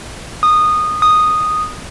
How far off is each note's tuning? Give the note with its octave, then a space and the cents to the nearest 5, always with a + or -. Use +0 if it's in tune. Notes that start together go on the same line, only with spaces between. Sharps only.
D#6 -15
D#6 -5